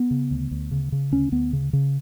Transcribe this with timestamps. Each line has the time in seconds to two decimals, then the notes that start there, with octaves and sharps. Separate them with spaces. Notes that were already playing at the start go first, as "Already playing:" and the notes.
Already playing: B3
0.11 C#3
0.31 D2
0.51 D2
0.71 C#3
0.92 C#3
1.12 D2 C#4
1.32 D2 B3
1.53 C#3
1.73 C#3